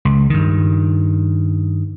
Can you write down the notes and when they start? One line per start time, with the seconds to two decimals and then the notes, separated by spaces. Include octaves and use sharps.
0.05 C#2
0.30 G2 D#3